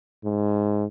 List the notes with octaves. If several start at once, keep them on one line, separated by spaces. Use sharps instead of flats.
G#2